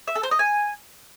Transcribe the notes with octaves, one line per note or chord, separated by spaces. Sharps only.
E5
A4
C5
D#5
G#5